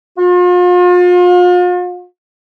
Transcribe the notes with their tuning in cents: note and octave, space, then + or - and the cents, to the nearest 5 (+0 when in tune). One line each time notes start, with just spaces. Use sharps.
F4 +40